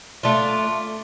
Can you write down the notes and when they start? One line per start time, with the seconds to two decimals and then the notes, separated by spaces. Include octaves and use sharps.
0.23 A3 D4 F4